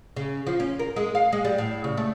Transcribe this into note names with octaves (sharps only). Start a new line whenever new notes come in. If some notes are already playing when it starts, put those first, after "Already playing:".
C#3
F3
C#4
A#4
G#3
F5
G#3
G3
A2
C#3
A3